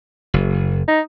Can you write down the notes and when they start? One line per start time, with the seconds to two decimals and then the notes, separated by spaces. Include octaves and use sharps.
0.34 F#1
0.88 D#4